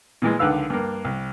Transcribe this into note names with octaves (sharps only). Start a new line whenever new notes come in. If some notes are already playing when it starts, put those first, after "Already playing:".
A#2 E3 G#3
C#2 D3 D#3 B4 F5 E6
G2 A#3
C2